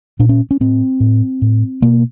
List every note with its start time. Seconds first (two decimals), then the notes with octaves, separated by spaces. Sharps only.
0.19 A#2 D4
0.29 C#4
0.51 C#4
0.60 A2 C4
1.00 A2
1.42 A2
1.82 B2 A#3